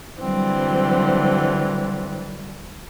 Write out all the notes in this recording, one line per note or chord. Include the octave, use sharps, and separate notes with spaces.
D3 E3 F#3 G3 C4